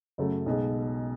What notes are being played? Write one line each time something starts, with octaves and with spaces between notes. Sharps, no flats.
F#2 C#3 F#3 A3
B1 B2 G#3